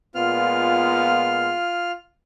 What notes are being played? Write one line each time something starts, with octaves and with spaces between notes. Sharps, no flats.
A#2 G#3 B3 F4 F6